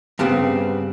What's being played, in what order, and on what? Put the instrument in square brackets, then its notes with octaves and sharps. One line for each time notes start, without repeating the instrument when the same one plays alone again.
[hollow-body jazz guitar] G2 C#3 B3 C4